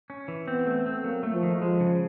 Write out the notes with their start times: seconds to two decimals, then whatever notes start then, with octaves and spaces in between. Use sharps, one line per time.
0.10 C#4
0.28 E3
0.48 B3 C4
0.66 A3
0.86 C4
1.04 F#3 A#3
1.23 A3
1.33 F3
1.43 D#3
1.61 F3 G#3
1.80 C#3